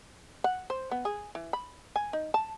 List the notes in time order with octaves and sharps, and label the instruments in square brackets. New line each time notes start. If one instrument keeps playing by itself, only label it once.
[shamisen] F#5
C5
B3
G#4
E3
B5
G#5
D#4
A5